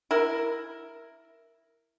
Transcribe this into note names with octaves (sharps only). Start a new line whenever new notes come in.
E4 A#4